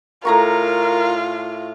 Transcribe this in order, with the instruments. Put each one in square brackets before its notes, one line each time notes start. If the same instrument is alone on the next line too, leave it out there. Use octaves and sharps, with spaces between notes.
[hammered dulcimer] A2 A#5 C#6 [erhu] F4 [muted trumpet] A#4